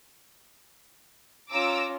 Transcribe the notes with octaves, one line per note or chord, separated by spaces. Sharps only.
C#4 F4 A#5 D6 E6